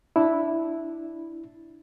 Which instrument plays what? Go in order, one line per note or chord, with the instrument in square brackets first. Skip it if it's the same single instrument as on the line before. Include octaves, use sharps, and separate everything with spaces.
[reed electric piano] D4 E4